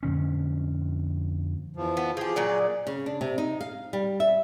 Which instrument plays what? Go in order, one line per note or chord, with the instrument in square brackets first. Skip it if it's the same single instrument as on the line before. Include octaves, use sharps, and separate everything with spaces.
[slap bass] F2 D3 C#4
[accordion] E2 F3
[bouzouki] B3
[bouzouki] F3 G4 [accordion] G#4
[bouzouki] A#2 F#3 D5
[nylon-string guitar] C#3
D4
C3
D#4
F5
G3
E5